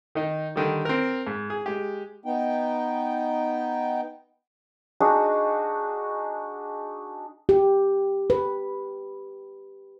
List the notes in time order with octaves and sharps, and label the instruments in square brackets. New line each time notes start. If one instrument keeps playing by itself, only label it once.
[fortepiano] D#3 D#4
D3 D#3 G3
C4 A#4
G#2
G#4
G#3 G4
[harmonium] B3 D#4 G5
[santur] D4 D#4 F#4 G#4
[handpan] G4
B4